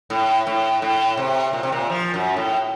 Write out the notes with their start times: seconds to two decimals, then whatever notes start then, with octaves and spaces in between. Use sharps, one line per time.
0.10 A2
0.47 A2
0.82 A2
1.17 C3
1.53 A#2
1.63 C3
1.72 A#2
1.90 F3
2.14 F#2
2.37 A2